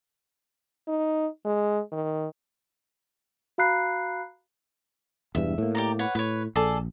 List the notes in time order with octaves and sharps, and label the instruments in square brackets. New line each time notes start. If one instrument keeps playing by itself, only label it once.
[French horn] D#4
G#3
D#3
[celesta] F#4 F5 A#5 B5 F#6 C7
[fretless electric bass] E1 E2 G2 [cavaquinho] E5
[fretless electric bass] A2 A#3
[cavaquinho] G4 D5 A#5
B4 C#5 F#5
[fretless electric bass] A2 [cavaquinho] B4 C#5
[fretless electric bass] A#1 [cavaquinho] G#4 A4 D5